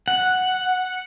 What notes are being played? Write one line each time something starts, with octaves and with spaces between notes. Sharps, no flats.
F#5